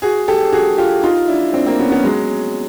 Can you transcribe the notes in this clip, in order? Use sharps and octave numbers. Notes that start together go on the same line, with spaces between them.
F#4 G#4
G4 A4
F#4 G#4
F4 G4
D#4 F4
D4 E4
C4 D4
A#3 C4
B3 C#4
B3 C#4
F#3 G#3